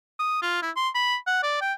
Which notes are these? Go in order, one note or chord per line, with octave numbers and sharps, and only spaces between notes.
D#6
F4
E4
C6
B5
F#5
D5
G5